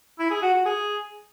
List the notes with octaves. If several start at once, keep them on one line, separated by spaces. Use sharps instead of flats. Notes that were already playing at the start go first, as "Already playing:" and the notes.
E4
G#4
F#4
F#4
G#4